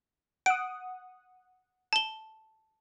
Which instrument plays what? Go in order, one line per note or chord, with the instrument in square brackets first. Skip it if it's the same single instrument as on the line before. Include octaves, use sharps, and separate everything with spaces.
[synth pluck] F#5 D#6 [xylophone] D7
[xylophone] A5 G7